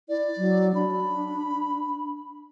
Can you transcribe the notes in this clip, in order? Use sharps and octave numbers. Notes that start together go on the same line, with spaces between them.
E4 D5
F#3
D4 B5